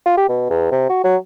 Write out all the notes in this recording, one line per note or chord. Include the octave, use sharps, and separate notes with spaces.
F4
G4
B2
E2
C3
F#4
F#3